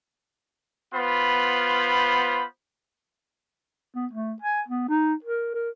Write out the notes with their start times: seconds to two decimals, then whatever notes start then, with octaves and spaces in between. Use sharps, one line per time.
0.94 B3 F4 C5 B5
3.95 B3
4.13 A3
4.42 G#5
4.68 B3
4.89 D#4
5.24 A#4
5.54 A#4